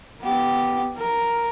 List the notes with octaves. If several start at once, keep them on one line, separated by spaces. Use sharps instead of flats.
B3 G4
A#4